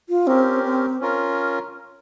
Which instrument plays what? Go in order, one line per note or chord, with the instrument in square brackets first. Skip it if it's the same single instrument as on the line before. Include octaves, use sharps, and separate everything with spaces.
[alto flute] F4
[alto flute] C4 [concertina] C#4 G4 A#4
[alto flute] C4
[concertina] C#4 F4 A#4